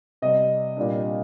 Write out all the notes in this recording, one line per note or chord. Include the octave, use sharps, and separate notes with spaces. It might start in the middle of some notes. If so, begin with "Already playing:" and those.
C3 G3 C4 D#5
A#2 G3 D4